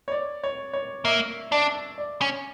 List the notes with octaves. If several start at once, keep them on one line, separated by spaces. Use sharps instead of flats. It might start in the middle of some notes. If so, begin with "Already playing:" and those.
C#5
D5
C#5
C#5
A#3 E5
D4 D5
D5
C#4